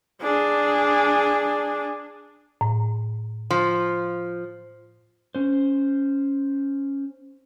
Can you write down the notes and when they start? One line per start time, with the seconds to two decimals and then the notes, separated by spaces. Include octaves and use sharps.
0.22 D4 G#4
2.61 A2
3.51 F3
5.35 C#4 C5